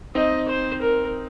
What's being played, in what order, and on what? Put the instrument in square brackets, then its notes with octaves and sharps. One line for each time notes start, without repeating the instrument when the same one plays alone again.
[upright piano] C4 D#4 [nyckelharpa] D#5
[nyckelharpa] C5
A#4